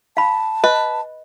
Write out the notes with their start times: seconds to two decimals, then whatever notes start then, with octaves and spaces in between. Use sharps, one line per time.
0.17 F5 A5 B5
0.64 B4 D#5